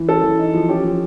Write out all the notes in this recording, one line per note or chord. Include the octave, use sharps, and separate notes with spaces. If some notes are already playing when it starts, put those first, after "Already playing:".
Already playing: E3
C#4 A4
E3
D#4
F3
C#4 G4
F3